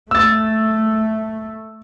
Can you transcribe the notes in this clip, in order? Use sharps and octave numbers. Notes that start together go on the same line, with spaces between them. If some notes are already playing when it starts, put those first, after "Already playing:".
A3 E6 A6